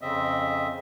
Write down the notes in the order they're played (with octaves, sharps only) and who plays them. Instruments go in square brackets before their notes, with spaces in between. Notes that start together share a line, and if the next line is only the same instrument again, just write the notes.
[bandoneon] F2 C#3 C4 D#5 E5